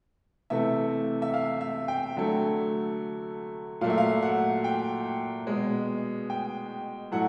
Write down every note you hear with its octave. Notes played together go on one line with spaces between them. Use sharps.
C3 E3 A3 E5
E5
F5
E5
G5
D3 F#3 A3
A#2 F#3 A3 F5
E5
F5
F#5
G5
B2 G#3
G5
A2 F#3 A3 F#5